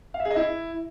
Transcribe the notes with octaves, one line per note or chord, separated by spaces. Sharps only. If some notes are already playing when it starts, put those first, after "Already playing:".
F5
E5
G#4
D#5
E4